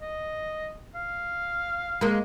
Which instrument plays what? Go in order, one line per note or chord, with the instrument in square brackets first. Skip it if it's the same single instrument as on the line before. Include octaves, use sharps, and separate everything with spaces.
[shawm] D#5
F5
[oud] G#3 A#3